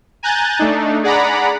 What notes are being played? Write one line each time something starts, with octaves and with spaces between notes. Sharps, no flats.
G#5 A#5 F#6 G6 A6
A3 D4 D#4
G#4 D5 F#5 A#5 B5